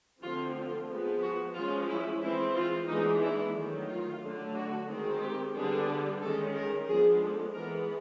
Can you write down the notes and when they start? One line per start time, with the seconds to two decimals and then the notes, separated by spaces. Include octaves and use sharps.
0.22 D3 F3 A3 C4 F4
0.54 F4
0.89 F3 G#3 B3
1.22 F#4
1.54 F3 G#3 C#4 F4
1.89 E4
2.22 E3 G#3 C4 E4
2.55 F4
2.89 E3 G#3 B3 D4 D#4
3.21 E4
3.55 D#3 F#3 A3
3.88 F4
4.21 D3 F#3 A3 D4
4.55 F#4
4.88 D#3 G#3 C4
5.22 G4
5.55 D3 G3 B3 D4 G#4
6.22 D#3 G#3 C#4 A4
6.55 A#4
6.88 F3 G#3 B3 D4 G#4
7.21 A4
7.54 E3 G#3 B3 A#4